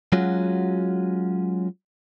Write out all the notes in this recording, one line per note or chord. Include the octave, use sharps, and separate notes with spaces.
F#3 G#3 C#4 F4 F#4